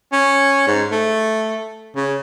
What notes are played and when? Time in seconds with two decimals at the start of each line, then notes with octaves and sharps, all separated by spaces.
0.12 C#4
0.67 G#2
0.91 A3
1.96 C#3